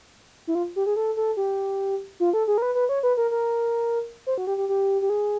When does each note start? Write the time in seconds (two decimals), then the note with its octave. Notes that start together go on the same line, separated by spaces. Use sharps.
0.47 E4
0.55 F4
0.76 G4
0.86 G#4
0.96 A4
1.17 A4
1.37 G4
2.20 F4
2.33 A4
2.48 G#4
2.58 A#4
2.62 B4
2.75 B4
2.89 C#5
3.03 B4
3.17 A#4
3.31 A#4
4.27 C5
4.38 F#4
4.47 G4
4.57 G4
4.69 G4
5.02 G4
5.10 G#4